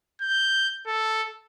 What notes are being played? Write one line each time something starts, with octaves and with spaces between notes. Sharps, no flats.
G6
A4